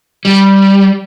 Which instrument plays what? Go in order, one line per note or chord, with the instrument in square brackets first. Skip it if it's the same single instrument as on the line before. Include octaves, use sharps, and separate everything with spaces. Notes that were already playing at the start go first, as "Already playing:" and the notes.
[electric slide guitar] G3